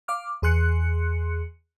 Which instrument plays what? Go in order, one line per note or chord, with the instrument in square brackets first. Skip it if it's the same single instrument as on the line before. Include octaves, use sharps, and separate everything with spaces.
[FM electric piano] F5 D6 F6
E2 G#4 C6 F#6 C#7